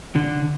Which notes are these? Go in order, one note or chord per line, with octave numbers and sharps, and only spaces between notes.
D3